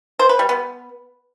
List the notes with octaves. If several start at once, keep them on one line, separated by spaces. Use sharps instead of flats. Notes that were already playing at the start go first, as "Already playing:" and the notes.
C5
B4
G3
B3